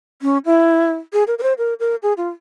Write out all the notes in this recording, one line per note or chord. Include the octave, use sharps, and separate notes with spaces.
C#4
E4
G#4
A#4
A#4
C5
A#4
A#4
G#4
F4